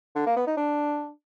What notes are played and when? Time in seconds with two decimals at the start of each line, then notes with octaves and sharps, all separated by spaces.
0.16 D3
0.26 A#3
0.36 B3
0.47 D#4
0.57 D4